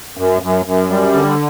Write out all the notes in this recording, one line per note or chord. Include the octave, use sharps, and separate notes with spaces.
F#2
F#2
F#2
G3
D3